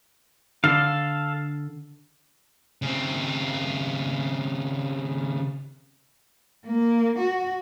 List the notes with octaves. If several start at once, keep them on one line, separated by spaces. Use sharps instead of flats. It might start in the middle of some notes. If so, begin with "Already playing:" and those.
D3 A4 F5
C#3 C4
A#3
F#4